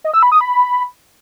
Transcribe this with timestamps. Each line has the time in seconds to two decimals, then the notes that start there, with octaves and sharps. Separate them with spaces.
0.04 D#5
0.14 E6
0.23 B5
0.32 D#6
0.41 B5